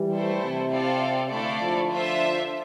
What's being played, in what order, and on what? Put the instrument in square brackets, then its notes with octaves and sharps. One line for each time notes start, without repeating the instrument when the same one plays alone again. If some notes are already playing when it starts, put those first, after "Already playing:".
Already playing: [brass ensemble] E3 G3
[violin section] A3 E4 A4 C5
[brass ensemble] C3
[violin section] C4 F4 A4 D5 F5
[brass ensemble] D3 [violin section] A3 E4 A4 D5 F5
[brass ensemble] D3 F3
[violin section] D4 F4 C5 E5